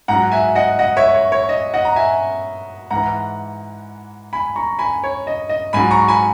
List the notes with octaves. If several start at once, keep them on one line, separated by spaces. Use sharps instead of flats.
G#2 F#3 F#5 A#5
E5 G#5
D#5 F#5
D#5 F#5
C#5 E5
C#5
C#5
D#5
D#5 F#5
A#5
E5 G#5
G#2 E3 F#5 A#5
G#5 B5
A#5 C#6
G#5 B5
C#5
D#5
D#5
G#2 F#3 G#5 B5
A#5 C#6
G#5 B5